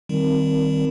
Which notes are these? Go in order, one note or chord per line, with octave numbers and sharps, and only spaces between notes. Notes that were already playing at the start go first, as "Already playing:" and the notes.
D#3 G3 C4 D#4 A#4